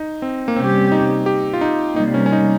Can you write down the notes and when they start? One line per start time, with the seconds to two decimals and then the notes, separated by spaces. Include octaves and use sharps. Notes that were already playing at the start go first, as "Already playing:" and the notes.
Already playing: D#4
0.22 C4
0.48 A#3
0.56 C3 G3 C4 C#4 G4
0.92 D#4
1.26 G4
1.53 F4
1.61 D#4
1.96 C3 G3 A#3 D#4
2.14 C#4
2.26 C#4
2.32 D#4